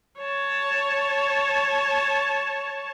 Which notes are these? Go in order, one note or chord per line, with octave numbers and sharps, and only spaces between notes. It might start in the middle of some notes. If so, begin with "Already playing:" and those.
C#5 A5